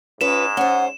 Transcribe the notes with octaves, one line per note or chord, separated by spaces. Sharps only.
G#2 C#4 F4 B4 E7
C#4 C5 F#5